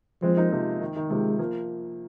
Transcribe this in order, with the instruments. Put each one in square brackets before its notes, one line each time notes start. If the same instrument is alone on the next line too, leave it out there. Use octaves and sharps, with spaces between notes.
[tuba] F3 [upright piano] G#3 C4
[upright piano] A#3 D#4
C3 F3
D#3
D#3
[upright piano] C3 F3 [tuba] G#3
[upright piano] F3 A#3